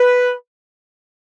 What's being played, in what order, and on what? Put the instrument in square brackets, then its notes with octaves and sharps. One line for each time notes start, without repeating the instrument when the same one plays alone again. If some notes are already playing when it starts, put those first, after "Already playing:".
Already playing: [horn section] B4